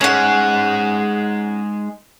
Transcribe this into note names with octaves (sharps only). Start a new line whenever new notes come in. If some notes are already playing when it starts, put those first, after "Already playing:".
G#3 C#4 D#4 F#5